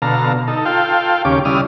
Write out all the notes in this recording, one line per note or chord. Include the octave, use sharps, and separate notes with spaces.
B2 D3 A4 F5 A#5
D#4 A4
F4 A4 F5 G5
D#2 C#3 C#4 G4 D6
C#3 G3 E4 D5 D#6 F6